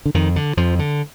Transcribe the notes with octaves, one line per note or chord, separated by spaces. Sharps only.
D3
F2 D#3
D3
F2 F3
D3